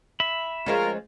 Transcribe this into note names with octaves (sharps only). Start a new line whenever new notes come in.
E5 B5
F3 G#3 C#4 F4 A#4